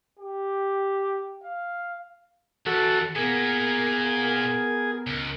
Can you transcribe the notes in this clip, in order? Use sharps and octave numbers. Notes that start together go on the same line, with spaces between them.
G4
F5
E2 F#4 A4
A#2 A#3 B3 G#4 A#4
C#2